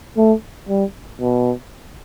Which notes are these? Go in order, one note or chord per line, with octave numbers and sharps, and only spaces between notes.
A3
G3
B2